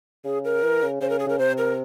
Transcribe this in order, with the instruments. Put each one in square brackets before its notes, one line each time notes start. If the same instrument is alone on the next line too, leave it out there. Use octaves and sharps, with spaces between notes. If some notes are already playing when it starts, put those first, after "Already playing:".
[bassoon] C#3 [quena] G#4
[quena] A#4
[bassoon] E3
C#3
[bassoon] C#3 [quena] C5
[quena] A#4
G#4
[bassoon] C#3 [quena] A#4
[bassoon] C3 [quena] C5
[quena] A#4